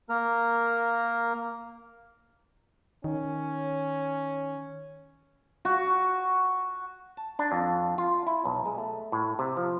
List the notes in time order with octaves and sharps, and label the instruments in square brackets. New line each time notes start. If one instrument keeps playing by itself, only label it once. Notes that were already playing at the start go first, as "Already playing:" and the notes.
[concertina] A#3 A#4
[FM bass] D#3 [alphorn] C#4
[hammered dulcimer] F#4
[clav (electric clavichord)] A5
D4
F2
F4
E4
B1
G#3
A3
A2
C3
F3